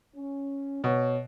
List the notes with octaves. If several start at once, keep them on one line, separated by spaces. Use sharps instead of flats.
C#4
B2 C#5